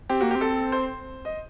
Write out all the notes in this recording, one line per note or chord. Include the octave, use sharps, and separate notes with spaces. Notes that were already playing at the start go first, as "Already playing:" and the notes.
C4 G4
A#3 F#4
C4 G4
A4
C5
D#5